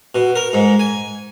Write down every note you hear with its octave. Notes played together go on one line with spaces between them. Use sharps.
B2
A#4
G#2
G#5